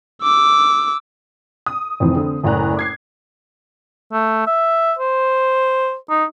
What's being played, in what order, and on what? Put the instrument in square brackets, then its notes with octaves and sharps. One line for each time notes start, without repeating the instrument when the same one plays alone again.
[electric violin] D6 E6
[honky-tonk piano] D#6
F1 F2 E3 C4
D3 C4
F#1 A2 D5 G#5 A#5 F#6
D6 G#6 C7
[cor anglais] A3
E5
C5
D#4